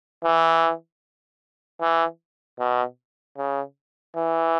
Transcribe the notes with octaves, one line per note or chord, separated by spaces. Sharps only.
E3
E3
B2
C#3
E3